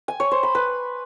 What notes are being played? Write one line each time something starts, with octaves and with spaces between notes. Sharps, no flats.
G#5
C#5
C5
B5
B4